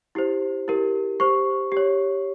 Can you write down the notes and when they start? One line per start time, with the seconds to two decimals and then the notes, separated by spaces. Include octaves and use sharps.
0.15 E4 G4 C5
0.68 E4 G4 A#4
1.20 G4 C5 C#6
1.72 G4 C#5